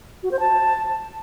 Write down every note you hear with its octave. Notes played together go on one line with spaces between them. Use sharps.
F#4
C5
A5